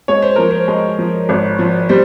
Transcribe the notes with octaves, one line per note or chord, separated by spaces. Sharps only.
G#3 C#5
C5
F3 A#4
C5
G#3
F3
G#1
F3
G3 C5